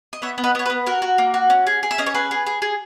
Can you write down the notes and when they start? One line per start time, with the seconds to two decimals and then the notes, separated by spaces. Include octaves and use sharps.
0.13 D#5
0.22 B3 C#5 E5
0.38 B3
0.44 B4 D#5
0.55 B3 C#5
0.66 B4
0.70 B3
0.86 F#4 A#4
1.02 F#4
1.18 A#3
1.34 F#4
1.50 C#4
1.67 G#4
1.83 G#4
1.91 E5
1.98 C#4 D#5
2.06 C#5
2.14 G#4 B4
2.31 G#4
2.46 G#4
2.62 G#4